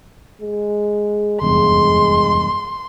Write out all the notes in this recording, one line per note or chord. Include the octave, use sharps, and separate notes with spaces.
G#3
F1 E2 G2 G#3 C6